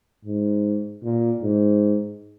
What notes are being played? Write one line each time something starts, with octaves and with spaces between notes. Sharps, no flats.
G#2
A#2
G#2